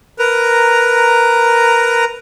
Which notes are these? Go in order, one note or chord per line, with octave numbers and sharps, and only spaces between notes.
A#4 B4 A#5